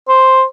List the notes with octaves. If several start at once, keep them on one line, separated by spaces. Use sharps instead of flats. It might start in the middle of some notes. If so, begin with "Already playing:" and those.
C5